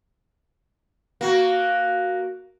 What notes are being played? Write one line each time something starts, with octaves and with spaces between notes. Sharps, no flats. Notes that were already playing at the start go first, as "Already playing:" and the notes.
A#3 F#4